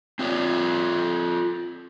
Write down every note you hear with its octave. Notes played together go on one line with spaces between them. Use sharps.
C4 F4 G4 C#5 D5